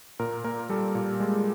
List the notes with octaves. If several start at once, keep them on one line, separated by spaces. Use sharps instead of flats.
A#2 A#4
A#3 A#4
G3 A4
A#2
G#3